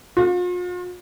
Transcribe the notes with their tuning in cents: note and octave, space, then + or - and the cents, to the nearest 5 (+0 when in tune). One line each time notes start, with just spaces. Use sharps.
F4 +40